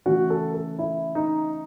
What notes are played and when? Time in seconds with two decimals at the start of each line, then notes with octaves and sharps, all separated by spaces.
0.06 C#3 E3 A3 F#4
0.30 A4
0.54 A4
0.79 E4
1.15 D#4